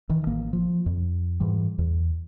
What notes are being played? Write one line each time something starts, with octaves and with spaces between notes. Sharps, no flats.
D#3 E3
A1 A#3
F3
F2
G#2 E3 G3
E2